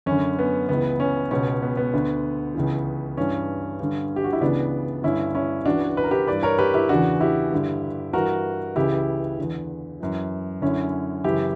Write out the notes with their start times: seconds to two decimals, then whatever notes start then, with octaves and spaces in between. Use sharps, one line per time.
0.06 F#2 D3 C#4
0.38 B3
0.69 C#2 C#3 E3 B3
1.00 C#4
1.31 C#2 B2 C#4
1.62 B3
1.77 B3
1.94 D2 D3
2.55 C#2 C#3 E3
3.17 G2 E3 C#4
3.80 G2 D3
4.16 G4
4.24 F#4
4.33 E4
4.41 C#2 C#3 E3 B3 D4
5.03 G2 D3 C#4 E4
5.35 C#4 E4
5.65 C#2 C#3 E3 D4 F#4
5.97 B4
6.04 A#4
6.11 G4 B4
6.27 G2 E3 B4 D5
6.43 A#4 C#5
6.59 G4 B4
6.74 E4 G4
6.89 E2 C#3 E3 D4 F#4
7.20 E4 G4
7.52 G2 D3
8.13 G2 E3 F#4 A#4
8.76 C#2 C#3 E3 E4 G4
9.38 E2 D3
10.00 F#2 E3
10.62 F#2 D3 C#4 E4
11.24 F#2 C#3 E3 E4 G4